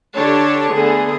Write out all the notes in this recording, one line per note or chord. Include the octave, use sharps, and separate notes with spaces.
D3 D4 G4 C#5 A5
D3 A3 B3 G#4